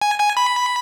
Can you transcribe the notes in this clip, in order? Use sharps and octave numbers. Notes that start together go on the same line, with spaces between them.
G#5
G#5
B5